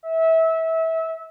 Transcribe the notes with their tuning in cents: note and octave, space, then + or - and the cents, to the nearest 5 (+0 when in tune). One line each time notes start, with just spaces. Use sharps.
E5 -25